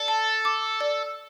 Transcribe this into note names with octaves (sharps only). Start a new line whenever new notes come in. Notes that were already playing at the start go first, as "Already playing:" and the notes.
Already playing: A4 D5
A5
D6
D5